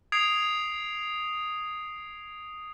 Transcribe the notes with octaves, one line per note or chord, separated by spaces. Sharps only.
D#6 G#6 C7 D7 F7